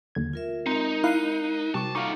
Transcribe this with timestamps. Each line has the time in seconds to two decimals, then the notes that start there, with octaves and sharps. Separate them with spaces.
0.15 D#2 D3 G#6
0.33 F4 A#4 E5
0.66 G#3 C4 D#4 A#4
1.04 E4 F5 F#6 C7 D#7
1.74 C3 G3 F#4 C5 A5 C#6 D6
1.95 D#4 F4 A4 F#5 C#6 D6